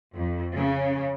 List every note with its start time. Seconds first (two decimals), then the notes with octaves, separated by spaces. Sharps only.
0.15 F2
0.56 C#3